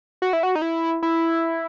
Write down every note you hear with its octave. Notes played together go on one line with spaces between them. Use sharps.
F#4
E4
F#4
D#4
E4
E4